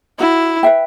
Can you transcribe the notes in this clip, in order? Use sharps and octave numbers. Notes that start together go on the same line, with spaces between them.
E4 F#4
B4 E5 G5